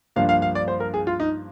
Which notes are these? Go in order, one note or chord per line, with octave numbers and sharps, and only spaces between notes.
G2 F3 A#3 D4 F5
F5
F5
D5
C5
A#4
G#4
F4
D#4